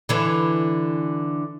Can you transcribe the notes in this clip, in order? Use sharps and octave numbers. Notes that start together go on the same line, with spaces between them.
D3 E3